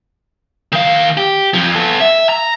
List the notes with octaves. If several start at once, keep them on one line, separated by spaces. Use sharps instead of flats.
D#3 F5
G4
F2 F3
B3 A4
E5
A#5